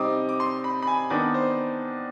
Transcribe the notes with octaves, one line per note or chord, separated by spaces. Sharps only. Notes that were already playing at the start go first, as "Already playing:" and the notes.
Already playing: C3 G3 C4 D#4 D6 D#6
D6
C6
B5
B5
G#5
D#3 B3 D4 D5
C5